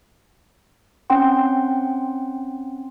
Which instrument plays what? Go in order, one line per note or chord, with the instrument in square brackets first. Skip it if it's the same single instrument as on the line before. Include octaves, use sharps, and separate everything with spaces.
[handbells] C4 C#4 F#5 G5 C6